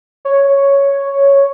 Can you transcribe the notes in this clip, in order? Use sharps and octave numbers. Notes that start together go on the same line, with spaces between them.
C#5